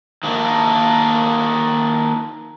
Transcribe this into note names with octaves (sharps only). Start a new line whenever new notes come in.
D#3 A#3 D4